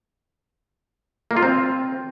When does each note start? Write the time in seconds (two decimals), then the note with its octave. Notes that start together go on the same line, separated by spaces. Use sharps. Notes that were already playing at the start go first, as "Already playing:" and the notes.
1.31 A#3
1.37 F4
1.43 C4